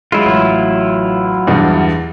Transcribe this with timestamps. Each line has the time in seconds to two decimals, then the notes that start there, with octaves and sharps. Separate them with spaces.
0.12 F#3 G#3 E4 F4
0.25 A1
1.47 E2 G2